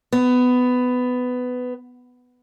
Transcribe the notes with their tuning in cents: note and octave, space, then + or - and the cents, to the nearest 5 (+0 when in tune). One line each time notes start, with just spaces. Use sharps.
B3 +15